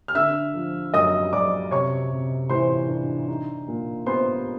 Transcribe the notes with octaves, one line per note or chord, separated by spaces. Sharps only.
F6
D3 E5 E6
F3
F#2 D#5 D#6
F#2 D5 D6
C3 C#5 C#6
C3
E3 C5 C6
D4
D#4
A#2
B3 C5 C6